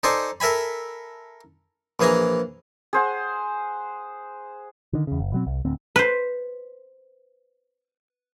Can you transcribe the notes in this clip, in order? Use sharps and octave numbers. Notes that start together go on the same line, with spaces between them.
D#4 A4 C5 D5 G#5
A4 A#4 E5 G#5 B5
A#1 E3 G#4 G#5 A#5
G#4 C5 F#5
D3 D#3
E2 C#3
F#1
B2 F#3 C4
C2
D1 D2 C4
B4 C5